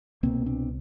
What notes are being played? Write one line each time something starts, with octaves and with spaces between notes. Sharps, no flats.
C2 B2 A#3 C4
C4 D4